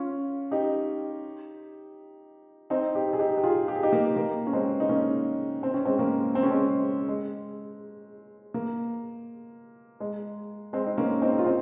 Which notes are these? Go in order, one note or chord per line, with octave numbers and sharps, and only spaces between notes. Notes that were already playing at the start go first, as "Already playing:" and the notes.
Already playing: C#4 F4
D#4 G4
C4 D#4
D#4 G4
G#4
D#4 G4
G4
F4 G#4
G4
G#4
D#4 G4
A#3
A#3
C#4
G#3 C4
D#4
A#3 C#4
C4
C#4
G#3 C4
A#3 C#4
C4
C#4
G#3 C4
G#3
A#3
G#3
G#3 C4
D#4
A#3 C#4
C4 D#4
F4
C4 D#4